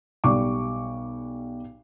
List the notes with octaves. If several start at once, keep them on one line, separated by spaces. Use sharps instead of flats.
B1 G3 C#6 D6